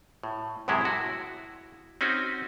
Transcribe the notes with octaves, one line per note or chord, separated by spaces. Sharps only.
A2
F#2 A2 C3 G#3 E4
E4 F#4
C4 C#4 D#4 F#4